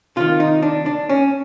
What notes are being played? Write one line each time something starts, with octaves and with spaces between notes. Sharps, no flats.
C3 D#3 F4
D#4
D4
D4
C#4